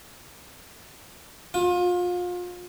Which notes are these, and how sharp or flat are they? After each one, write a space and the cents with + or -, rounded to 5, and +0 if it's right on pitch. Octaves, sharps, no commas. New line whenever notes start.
F4 +30